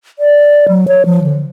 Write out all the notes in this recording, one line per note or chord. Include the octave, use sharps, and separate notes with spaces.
D5
F#3
C#5
F3
D3